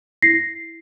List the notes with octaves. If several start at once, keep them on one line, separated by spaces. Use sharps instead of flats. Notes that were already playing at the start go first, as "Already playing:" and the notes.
E4 A#6 C7